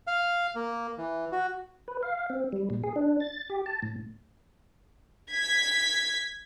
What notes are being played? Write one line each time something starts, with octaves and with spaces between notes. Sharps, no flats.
F5
A#3
E3
F#4
B4
F5
C4
G3
A#2
G#4
D4
A6
G4
A5
A2
G#6 B6